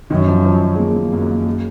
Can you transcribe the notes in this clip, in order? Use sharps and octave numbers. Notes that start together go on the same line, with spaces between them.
F#2 D#3
F3
D#3
F3
G#3
A#3
A#3
F#2 A#3
A#3
G#3